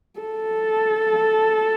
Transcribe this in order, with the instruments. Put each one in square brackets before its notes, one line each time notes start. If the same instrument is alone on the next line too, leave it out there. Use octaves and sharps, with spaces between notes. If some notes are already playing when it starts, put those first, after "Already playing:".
[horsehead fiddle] A4